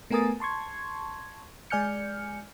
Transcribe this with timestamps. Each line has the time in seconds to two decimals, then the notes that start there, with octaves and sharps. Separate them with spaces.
0.10 A3 B3 A#4 G#5 D#6 A6
0.40 A5 C6 C#6 G#6
1.70 G#3 D5 G#5 F6 G6 C#7